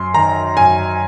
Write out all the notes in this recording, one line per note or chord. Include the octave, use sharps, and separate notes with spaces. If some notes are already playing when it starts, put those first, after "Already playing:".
Already playing: F#2 C6
D#3 A#5
F#2 G#5